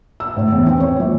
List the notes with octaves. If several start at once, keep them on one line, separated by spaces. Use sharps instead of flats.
E6
A2
E2
C4
C#5
A#1